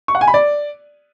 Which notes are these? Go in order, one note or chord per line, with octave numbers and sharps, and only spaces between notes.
C#6
F#5
G#5
B5
D5